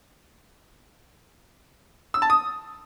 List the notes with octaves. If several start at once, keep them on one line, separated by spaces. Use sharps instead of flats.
E6
A5
D#6